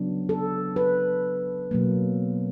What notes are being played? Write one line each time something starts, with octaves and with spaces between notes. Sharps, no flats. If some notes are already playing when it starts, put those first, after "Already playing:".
Already playing: C#3 F#3 B3 D4
A4
B4
B2 F#3 A#3